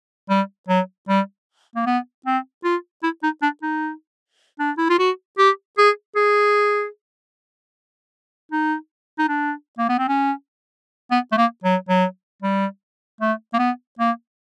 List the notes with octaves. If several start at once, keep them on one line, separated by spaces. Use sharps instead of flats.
G3
F#3
G3
A#3
B3
C4
F4
E4
D#4
D4
D#4
D4
E4
F4
F#4
G4
G#4
G#4
D#4
D#4
D4
A#3
B3
C4
C#4
B3
A3
A#3
F#3
F#3
G3
A3
A#3
B3
A#3